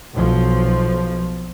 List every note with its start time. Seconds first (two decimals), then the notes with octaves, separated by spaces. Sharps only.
0.14 B1 F3